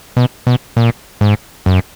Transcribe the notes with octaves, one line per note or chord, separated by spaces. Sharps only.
B2
B2
A#2
G#2
F#2